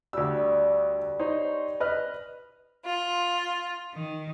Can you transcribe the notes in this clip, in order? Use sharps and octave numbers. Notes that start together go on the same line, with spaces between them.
D2 G3 E6
D#4 C5 C#5
B4 D#5 F6
F4
D#3